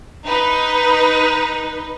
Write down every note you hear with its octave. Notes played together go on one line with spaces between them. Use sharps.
D#4 B4